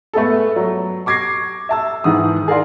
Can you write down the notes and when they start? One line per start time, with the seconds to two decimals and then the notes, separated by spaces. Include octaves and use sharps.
0.13 A3 B3 G#4 A4
0.56 F#3
1.06 C#6 D6 G#6 A#6 C7
1.69 E5 A5 E6
2.04 G#2 D#3 E3 F#5 D#6
2.48 G#4 A#4 D5 F5 C6